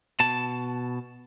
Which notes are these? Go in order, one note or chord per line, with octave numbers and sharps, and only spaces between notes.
B2 A5